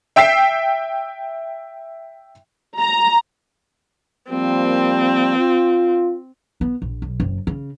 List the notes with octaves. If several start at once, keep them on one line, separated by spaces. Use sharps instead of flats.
E5 G5 E6 B6 C7
A#5
F3 G3 A#3 C4
F4
B3
A#1
B1
F#1
C#3